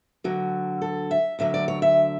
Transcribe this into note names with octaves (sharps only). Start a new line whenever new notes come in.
D2 D3 F#3 F#4
A4
E5
D2 D3 F#3 E5
D5
C#5
E5